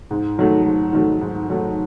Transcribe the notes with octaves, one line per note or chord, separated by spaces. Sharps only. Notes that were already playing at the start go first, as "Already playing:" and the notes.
G#2
D#3 F#3 A3
G#2
D#3 F#3 A3
G#2
D#3 F#3 A3